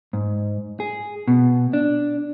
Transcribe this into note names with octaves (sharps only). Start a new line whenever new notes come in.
G#2
G#4
B2
D4